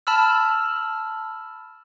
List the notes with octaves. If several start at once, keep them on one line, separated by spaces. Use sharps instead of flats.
A5 B5 E6 F6